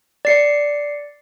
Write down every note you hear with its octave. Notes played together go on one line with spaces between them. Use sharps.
D5 C7 C#7